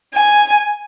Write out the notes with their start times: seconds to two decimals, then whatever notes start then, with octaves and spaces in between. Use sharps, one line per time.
0.15 G#5